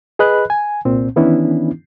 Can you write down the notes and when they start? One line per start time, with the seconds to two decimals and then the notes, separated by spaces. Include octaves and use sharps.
0.19 G#4 B4 D#5 B5 F#6
0.50 G#5
0.85 C2 A#2 C4
1.16 D#3 E3 B3 C#4 D4 E4